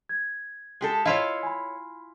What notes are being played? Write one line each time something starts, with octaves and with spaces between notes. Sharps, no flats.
G#6
G#3 G4 A4
E4 F4 C#5 D#5 F5
G#5 B5